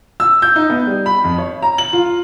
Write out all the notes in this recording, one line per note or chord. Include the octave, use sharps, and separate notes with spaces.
E6
G6
D#4
B3
G3
B5
F2
C#5
A#5
F#7
F4